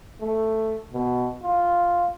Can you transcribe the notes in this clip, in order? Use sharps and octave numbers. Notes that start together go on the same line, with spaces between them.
A3
B2
F4